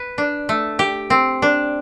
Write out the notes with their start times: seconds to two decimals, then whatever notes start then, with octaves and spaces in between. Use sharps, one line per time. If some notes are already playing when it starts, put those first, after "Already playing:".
Already playing: B4
0.18 D4
0.49 A3
0.79 G4
1.10 C4
1.42 D4